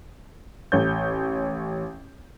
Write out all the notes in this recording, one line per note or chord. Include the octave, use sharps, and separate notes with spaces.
A1 C#5 G6